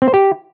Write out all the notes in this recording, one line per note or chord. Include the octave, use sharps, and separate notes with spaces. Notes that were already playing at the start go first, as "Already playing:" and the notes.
C4
C5
G4